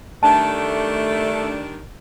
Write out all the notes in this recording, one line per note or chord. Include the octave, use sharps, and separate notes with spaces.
D#3 G3 A3 D4 A5